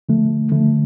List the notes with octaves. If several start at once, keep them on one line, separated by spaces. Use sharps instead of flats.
D3 F3 A3
D3 F3 A3